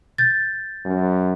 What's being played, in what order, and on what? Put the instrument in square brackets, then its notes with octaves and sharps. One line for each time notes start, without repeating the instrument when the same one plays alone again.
[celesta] G6 A6
[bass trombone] F#2